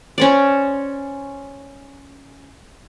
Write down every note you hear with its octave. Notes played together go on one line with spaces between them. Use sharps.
C#4 C5 D5